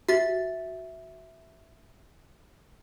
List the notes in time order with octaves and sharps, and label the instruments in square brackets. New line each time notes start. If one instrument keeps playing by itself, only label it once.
[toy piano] F#4 [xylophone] E5 A6